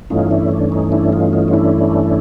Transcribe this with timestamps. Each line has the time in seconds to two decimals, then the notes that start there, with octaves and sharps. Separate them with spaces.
0.10 G2 E3 A3 C#4 D#4 F4
0.31 D4 E4
0.51 D4
0.72 D#4
0.92 D4 E4
1.13 D#4 F4
1.33 D#4 F4
1.48 F4
1.54 D4 E4